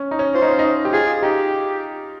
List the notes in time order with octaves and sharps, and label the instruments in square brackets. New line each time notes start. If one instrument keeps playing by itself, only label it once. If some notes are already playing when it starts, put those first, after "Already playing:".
Already playing: [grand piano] C#4
D#4
C#4
[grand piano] F4 [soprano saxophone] C5
[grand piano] D#4
C#4
D#4
G4
[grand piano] F4 [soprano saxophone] G#4
[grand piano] D#4 [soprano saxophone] G4